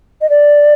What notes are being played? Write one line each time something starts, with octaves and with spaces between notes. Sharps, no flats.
D#5
D5